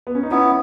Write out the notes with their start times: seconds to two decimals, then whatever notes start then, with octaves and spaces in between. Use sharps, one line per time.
0.07 B3
0.15 C#4
0.23 D#4
0.31 B3 C#4 E4